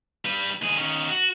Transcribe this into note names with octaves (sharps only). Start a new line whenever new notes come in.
G3 B4
D#2 G#4
D#3 C#4
F#4